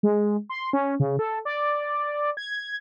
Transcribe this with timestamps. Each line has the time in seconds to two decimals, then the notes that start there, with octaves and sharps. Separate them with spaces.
0.03 G#3
0.49 C6
0.73 C#4
1.00 C#3
1.19 A4
1.45 D5
2.37 G#6